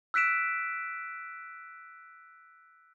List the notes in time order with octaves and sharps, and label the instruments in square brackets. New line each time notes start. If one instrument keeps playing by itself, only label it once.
[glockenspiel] E6 F#6 B6 D7 E7